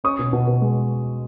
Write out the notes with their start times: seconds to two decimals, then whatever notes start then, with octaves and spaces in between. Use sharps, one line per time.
0.04 C#4 C#6 D#6
0.19 B2
0.33 B2
0.47 B2
0.62 G#3